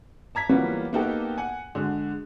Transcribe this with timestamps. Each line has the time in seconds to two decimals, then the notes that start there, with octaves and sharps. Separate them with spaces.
0.35 A5 A#5 G#6 B6
0.49 E3 F#3 G3 A#3 B3 F4
0.93 A#3 B3 D#4 F#4 G4 A4
1.38 F#5 G#5
1.75 D3 G#3 F#4 G#4